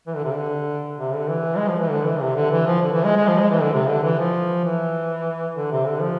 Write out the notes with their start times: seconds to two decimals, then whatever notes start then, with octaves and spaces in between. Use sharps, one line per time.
0.07 E3
0.16 D3
0.24 C3
0.33 D3
0.99 C3
1.15 D3
1.30 E3
1.57 G#3
1.68 F3
1.79 E3
1.91 D3
2.05 E3
2.21 C3
2.36 D3
2.51 E3
2.66 F3
2.82 D3
2.93 E3
3.05 G#3
3.16 G#3
3.28 F3
3.39 G#3
3.50 E3
3.62 D3
3.73 C3
3.89 D3
4.03 E3
4.19 F3
4.64 E3
5.56 D3
5.71 C3
5.87 D3
6.02 F3